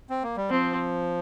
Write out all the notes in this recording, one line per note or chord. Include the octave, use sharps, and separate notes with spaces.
C4
A#3
G3
F3 C4